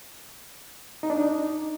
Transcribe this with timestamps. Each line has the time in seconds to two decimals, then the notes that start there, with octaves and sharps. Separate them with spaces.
1.03 D#4
1.10 D4
1.17 D#4